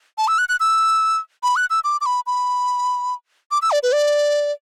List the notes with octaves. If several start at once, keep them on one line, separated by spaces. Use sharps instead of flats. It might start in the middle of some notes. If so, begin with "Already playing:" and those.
A5
E6
F#6
F#6
E6
B5
F#6
E6
D6
D6
B5
B5
D6
E6
D5
B4
D5